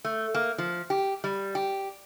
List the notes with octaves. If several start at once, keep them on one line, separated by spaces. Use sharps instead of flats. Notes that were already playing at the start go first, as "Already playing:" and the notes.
A3
A#3
F3
G4
G3
G4